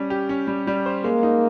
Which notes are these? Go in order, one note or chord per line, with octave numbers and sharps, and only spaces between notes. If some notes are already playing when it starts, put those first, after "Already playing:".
Already playing: G3 C#4
G4
C#4
G3
G3
C5
G#3 A#3
D#4